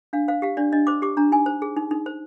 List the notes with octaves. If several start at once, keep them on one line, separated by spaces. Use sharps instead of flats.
D4 F5
C5 F5
G4 F5
D4 D5
D4 D#5
C5 D6
G4 D6
D4 A#5
D#4 G#5
C5
G#4
D#4
D#4
C5